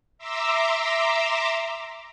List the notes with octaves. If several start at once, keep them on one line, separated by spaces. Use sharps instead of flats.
E5 A#5 C6 D6 E6